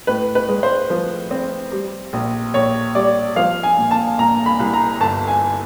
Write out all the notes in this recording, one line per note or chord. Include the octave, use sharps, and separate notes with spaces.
A2 B4
B4
G#3
C5
F3
C4
G3
A#1
A#1 C#5
G3 D5
F3 F5
G#5
A#2
A5
A#2 A#5
B5
C2
A#5
G1 A5
G#5